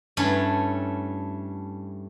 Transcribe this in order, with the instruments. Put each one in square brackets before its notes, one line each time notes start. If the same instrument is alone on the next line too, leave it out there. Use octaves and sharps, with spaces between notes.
[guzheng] G2 A3 C#4 E4 C#5